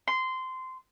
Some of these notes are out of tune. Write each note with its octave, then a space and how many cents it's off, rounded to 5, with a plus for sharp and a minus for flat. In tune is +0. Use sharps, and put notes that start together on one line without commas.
C6 -15